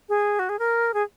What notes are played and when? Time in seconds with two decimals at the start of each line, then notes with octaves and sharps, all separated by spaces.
0.09 G#4
0.39 F#4
0.49 G#4
0.59 A#4
0.94 G#4